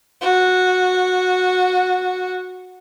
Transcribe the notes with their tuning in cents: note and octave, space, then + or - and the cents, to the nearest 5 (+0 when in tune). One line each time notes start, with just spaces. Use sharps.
F#4 -15